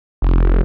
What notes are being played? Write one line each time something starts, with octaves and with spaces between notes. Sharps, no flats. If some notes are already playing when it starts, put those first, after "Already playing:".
F1